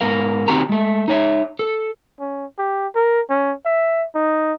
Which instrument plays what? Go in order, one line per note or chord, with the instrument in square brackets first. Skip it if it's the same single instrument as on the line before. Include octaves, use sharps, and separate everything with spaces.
[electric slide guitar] G#2 B3 A#4 F5
D#3 C4 D#4 F#4 G4 A#5
G#3 A3
D#4 C#5 E5
A4
[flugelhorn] C#4
G4
A#4
C#4
E5
D#4